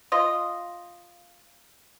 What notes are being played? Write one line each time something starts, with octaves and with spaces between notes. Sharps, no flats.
F4 D#5